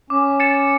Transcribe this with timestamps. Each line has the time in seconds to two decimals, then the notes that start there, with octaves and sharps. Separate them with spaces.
0.10 C#4 D6
0.40 A6 C#7 E7